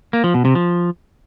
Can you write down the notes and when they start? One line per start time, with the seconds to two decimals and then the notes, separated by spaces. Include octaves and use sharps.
0.13 A#3
0.24 F3
0.34 B2
0.45 C3
0.55 F3